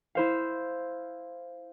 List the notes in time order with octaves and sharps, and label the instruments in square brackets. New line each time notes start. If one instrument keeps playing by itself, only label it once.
[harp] E4 C5 F5